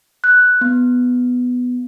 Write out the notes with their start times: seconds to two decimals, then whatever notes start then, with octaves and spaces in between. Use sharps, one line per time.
0.24 F#6
0.61 B3